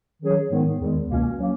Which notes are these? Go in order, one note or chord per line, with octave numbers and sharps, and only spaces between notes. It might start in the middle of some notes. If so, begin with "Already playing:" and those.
D#3 F#3 C#4 G#4 C#5
G#2 D#3 G#3 B3
E2 D#3 G#3
C#2 B2 A#3 C#4
F#3 A#3 C#4